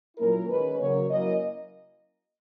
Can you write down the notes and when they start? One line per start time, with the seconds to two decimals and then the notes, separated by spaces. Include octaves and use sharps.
0.18 A#2 F#3 A#3 C#4 E4 A#4
0.48 D#3 G#3 C#4 B4
0.79 C#3 F#3 A#3 C#5
1.09 F#3 A#3 C#4 E4 D#5